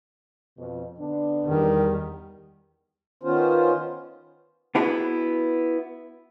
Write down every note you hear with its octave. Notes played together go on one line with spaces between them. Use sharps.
F2 B2
D3 B3 D4
E2 D#3 G3
D#3 B3 C#4 F4 C5
B3 D4 E4 F#4 G#4 B4